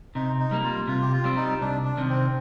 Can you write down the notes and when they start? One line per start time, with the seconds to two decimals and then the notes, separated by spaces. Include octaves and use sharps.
0.15 C3 D#4
0.40 D#4
0.51 G3 A#3
0.64 F4
0.87 C3 F4
1.02 G4
1.12 F4
1.24 G3 C4
1.36 D#4
1.61 C2 D4
1.85 D4
1.97 C3 D#3
2.09 C4